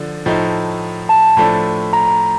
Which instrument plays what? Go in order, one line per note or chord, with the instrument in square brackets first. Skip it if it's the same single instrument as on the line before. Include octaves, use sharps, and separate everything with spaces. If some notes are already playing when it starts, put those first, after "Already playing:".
Already playing: [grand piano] D3 F3
A2 F3 A3 D#4
[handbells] A5
[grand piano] A2 F3 A3 D4
[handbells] A#5
A#5
A#5